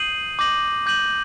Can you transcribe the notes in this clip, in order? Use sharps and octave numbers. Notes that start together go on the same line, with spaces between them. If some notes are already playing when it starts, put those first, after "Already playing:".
Already playing: D#6 G6 C7 D#7 F#7
D6 G6 A#6 D#7 F#7
D6 G6 A#6 D#7 F#7